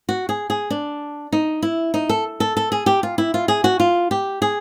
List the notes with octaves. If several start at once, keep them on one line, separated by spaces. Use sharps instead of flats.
F#4
G#4
G#4
D4
D#4
E4
D#4
A4
A4
A4
G#4
G4
F4
E4
F4
G#4
F#4
F4
G4
G#4